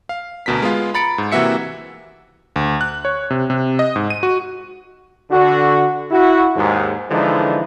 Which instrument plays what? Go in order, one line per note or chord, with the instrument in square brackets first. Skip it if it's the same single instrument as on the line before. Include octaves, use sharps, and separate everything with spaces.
[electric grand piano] F5
D2 B2 A#4 B6
G#3 B3 F4
A#5 B5 A6 C#7 D7
G#2
C3 E3 A#3 F#4 E5 C#7
D2
F#6
C#5
C3
C3
D#5
G#2
D#7
F#4
[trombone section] D3 F#4
E4 F#4
D#2 G#2
D3 E3 F3 G#3 D#4